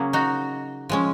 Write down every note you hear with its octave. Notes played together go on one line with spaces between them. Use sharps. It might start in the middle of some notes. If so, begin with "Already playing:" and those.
Already playing: C#3 F#3 A#3 C#4 G#4
D#4 F#4
F3 G#3 C#4